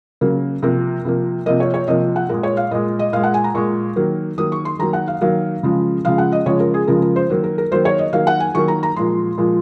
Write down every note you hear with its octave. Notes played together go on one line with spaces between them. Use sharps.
C#3 F#3 A#3
C3 F3 A#3 A#4
C3 F3 A#3
C3 F3 A#3 D#5
C#5
C#5
C3 F3 A#3 D#5
F#5
A#2 G#3 A#4
C#5
F5
A#2 G#3 D#5
D#5
A#2 G#3 F5
F#5
G#5
A#5
A#2 G#3 C#6
D#3 F#3 A#3
D#3 F#3 A#3 D#6
C#6
C6
D#3 F#3 A#3 A#5
F#5
F5
D#3 F#3 A#3 F5
C#3 F3 G#3
C#3 F3 G#3 F5
F#5
D#5
C#3 F3 G#3 C#5
A#4
G#4
C#3 F3 G#3 A#4
A#4
C5
D#3 F#3 A#3
A#4
A#4
D#3 F#3 A#3 C5
C#5
D#5
D#3 F#3 A#3 F5
F#5
G#5
D#3 F#3 A#3 C#6
A#5
A#5
A#2 F3 G#3 C6
A#2 F3 G#3